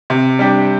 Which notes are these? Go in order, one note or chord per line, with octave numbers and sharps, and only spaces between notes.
C3
G3 D4 G4